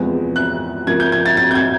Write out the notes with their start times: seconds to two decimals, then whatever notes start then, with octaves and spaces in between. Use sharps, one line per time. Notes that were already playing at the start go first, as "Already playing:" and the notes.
Already playing: E2 C3 F3 G#3 B3
0.36 F#6
0.87 C#3 F3 A#3 G#6
1.00 G6
1.12 G#6
1.26 A6
1.37 A6
1.51 G6
1.55 G#6